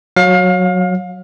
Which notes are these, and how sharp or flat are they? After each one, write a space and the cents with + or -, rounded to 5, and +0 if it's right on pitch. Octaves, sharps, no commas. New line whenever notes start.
F#3 -10 F5 +30